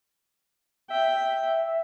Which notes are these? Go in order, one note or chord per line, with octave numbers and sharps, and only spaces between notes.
E5 G5